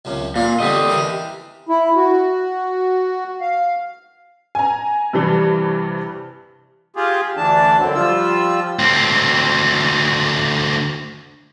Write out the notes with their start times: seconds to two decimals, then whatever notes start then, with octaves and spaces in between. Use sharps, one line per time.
0.05 C#2 F#2 C3
0.36 A#2 F4 A#4
0.60 D3 G3 C4 G4 D#5
0.90 E3 A#4
1.69 E4
1.96 F#4
3.41 F5
4.55 G#5 A#5
5.13 G2 C3 E3 G3
6.96 F4 G4 G#4
7.37 D2 E3 D4 A5
7.78 F#2 D3 F#3 C4
7.95 F3 G3 F4 E6
8.79 D2 C4